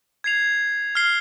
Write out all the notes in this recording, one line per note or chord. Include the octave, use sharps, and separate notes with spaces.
G#6 C7 F7
F6 C7 G7